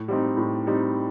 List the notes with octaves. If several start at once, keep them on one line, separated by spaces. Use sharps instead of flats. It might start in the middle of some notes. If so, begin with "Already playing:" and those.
Already playing: A2
G3 C4 D#4
A2
G3 C4 D#4